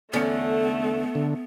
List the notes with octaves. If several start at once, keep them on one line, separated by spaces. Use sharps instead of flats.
E2 D3 A3 B3 C#4
D3